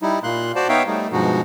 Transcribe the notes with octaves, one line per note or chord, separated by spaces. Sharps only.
G3 D#4 E4
A#2 A#3 C6 F#6
F#4 C5 D5 A5
B3 D#4 C#5 E5 F5 G5
G3 A3 D#4
G2 B2 F3 G#3 D#4 F#4